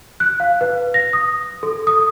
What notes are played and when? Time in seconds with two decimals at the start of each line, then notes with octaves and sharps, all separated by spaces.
0.20 F#6
0.40 F5
0.61 B4
0.94 A#6
1.13 D#6
1.63 A4
1.87 D#6